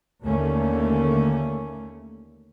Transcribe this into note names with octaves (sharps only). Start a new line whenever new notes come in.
D#2 D3 A3 A#3 C#4